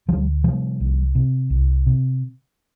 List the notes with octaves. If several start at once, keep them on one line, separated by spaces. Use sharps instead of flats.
D2 F3 G3
C3 F3 G3
C2
C3
C2
C3